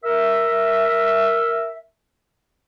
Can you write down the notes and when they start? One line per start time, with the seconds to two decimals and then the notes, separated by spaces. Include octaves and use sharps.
0.04 A#4 E5